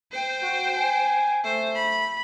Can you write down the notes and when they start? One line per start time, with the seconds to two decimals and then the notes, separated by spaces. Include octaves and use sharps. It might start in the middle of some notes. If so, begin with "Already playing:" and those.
0.11 C5 G5
0.42 F#4
0.76 G#5
1.44 A3 C5
1.75 B5